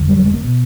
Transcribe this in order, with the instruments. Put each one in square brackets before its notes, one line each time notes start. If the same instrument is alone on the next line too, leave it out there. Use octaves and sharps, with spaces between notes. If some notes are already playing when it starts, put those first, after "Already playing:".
Already playing: [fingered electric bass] F#1 F2 D3
G3
F#3
G#3
A#3
B2